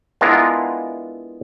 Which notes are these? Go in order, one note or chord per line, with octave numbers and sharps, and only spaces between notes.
G#3 B3 D4 E4 F4 A#4